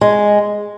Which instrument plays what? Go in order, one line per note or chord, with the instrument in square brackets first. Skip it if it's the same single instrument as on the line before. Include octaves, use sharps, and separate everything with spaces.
[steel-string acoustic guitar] G#3